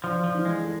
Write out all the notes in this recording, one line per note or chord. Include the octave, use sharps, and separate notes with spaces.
F3 D4
F3
E3
G#3
A4